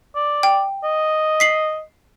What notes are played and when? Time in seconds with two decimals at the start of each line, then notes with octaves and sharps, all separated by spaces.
0.15 D5
0.43 G5
0.83 D#5
1.40 B6 C7 F#7